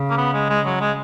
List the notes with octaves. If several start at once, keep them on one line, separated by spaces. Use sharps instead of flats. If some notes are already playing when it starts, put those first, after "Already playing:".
Already playing: C#3
A#3
B3
G#3
G#3
F#3
G#3